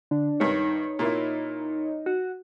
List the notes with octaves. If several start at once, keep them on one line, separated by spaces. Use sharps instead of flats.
D3 D4
G2 D#3 D#4 C#5
A#2 A#3 E4
F#4